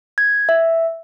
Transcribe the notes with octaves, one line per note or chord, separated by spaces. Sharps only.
G#6
E5